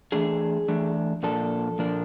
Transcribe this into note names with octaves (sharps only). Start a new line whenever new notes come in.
E3 A3 D4 G#4
E3 A3 D4
A#2 F3 A#3 D4 A4
A#2 F3 A#3 D4